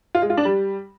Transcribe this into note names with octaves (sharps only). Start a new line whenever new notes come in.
F4
G#3
F4
D4
G3